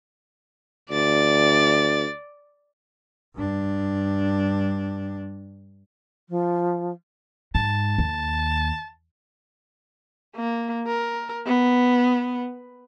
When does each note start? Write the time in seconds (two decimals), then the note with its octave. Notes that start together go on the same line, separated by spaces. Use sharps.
0.91 D2 D5 A6
3.35 G2 D4
6.29 F3
7.55 G#2 A5
7.98 D#2
10.35 A#3
10.87 A#4
11.46 B3